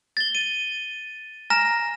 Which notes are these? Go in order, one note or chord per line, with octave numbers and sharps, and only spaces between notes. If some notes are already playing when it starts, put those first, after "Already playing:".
A6 G7
D#7
G#5 A#5 F6 A#6 E7